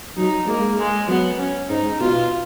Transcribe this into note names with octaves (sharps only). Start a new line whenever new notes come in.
F#3 D#4
G#3 A#3
G#3
F#3 B3
C#4
G#2 D#4
B2 F4